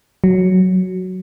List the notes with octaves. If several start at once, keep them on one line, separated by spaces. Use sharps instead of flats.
F#3